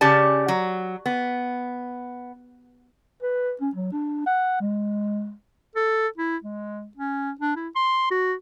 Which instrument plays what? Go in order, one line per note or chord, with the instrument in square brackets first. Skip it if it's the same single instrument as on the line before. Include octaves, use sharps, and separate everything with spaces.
[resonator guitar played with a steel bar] C#3 C#4 G4 D5 A5
F#3
B3
[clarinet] B4
C#4
F#3
D4
F#5
G#3
A4
E4
G#3
C#4
D4
E4
C6
F#4